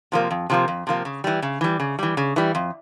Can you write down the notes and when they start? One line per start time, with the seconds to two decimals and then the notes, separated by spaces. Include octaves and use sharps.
0.12 C3 F3 A#3
0.31 F2
0.50 C3 F3 A#3
0.68 F2
0.87 C3 F3 A#3
1.05 C#3
1.24 E3 G3
1.42 C#3
1.61 E3 G3
1.80 C#3
1.99 E3 G3
2.17 C#3
2.36 E3 G3
2.55 F2